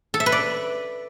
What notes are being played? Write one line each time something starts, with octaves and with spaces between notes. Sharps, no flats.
A4
E5
B4
D5